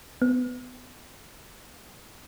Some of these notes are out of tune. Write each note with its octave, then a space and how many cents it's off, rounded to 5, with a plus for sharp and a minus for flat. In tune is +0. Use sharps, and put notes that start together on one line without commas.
B3 +20